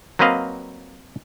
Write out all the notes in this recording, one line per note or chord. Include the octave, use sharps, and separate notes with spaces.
F#3 A#3 C4 B4 D#5 F5